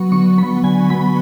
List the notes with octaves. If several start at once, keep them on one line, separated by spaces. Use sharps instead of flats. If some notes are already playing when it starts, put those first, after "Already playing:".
Already playing: F#3 B3 C#6
D3 C#6
F#3 B3 B5
D3 G#5
F#3 B3 B5